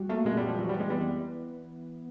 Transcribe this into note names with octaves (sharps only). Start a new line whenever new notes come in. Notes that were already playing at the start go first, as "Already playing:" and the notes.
Already playing: G3 F#4
A3 A#3
A#2 G#3
G3
A#2
F3
E3 F#3
G3
B3
G#3
E3 G3